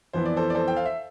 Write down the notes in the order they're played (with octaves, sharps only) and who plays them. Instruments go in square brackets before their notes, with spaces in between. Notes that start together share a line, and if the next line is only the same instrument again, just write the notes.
[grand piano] F2 E3 B3 C5
D5
A4 C5
D5
A4 C5
G5
F5
E5